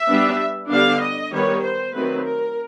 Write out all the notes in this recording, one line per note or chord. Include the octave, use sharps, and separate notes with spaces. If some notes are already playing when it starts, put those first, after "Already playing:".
Already playing: E5
G3 B3 D4
D3 G3 B3 D4 F5
D#5
D#3 G3 B3 C#5
C5
D#3 F#3 A3 C4 B4
A#4